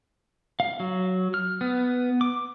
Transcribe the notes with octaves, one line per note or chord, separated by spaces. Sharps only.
F5
F#3
F6
B3
D6